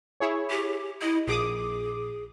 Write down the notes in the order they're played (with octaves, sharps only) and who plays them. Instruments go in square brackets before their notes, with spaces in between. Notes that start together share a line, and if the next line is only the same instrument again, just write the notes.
[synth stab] E4 G#4 C#5
[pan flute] G4
[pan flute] E4 [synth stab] D#5
[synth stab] A#1 D6 D#6 [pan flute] G#4